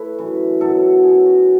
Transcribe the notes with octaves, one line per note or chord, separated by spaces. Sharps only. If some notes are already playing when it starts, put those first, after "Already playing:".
Already playing: A2 E4 A4 B4 C#5
F#2 E3
B2 F#3 A4
B2 F#3 G#4
F#4